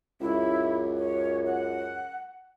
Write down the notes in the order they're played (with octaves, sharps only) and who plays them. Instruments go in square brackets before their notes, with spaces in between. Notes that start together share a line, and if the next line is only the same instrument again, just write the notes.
[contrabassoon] C#2 [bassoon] F#2 [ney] E4
[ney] C#5
F#5